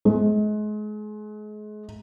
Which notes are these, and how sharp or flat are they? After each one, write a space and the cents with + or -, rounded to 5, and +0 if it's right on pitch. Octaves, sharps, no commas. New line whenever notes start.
G#3 +35